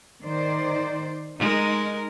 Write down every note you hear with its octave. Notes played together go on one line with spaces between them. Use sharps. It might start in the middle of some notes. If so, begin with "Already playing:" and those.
D#3 C5 D5
G#3 D#4 A#4